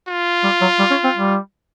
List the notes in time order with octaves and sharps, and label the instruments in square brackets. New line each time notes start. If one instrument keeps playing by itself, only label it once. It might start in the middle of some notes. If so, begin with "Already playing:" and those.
[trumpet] F4
[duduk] G3
F#3
G3
C#4
C4
G3